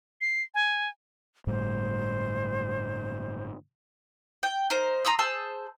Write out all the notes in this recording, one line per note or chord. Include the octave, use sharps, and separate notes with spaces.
C7
G#5
G1 A2 G3 C5
G5
D#4 A#4 C5
A#5 C6 D#6 E6
G#4 C5 A5 E6